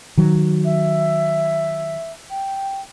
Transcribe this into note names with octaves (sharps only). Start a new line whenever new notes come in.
D#3 F#3
E5
G5